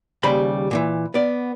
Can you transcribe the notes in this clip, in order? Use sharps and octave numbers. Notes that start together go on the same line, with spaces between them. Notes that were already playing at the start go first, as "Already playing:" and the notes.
D#2 C#3 G3 C5 B5 C6
A#2 D#3 E3
B3 D5